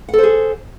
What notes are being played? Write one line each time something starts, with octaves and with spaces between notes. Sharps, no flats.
G#4 A4 C5 F#5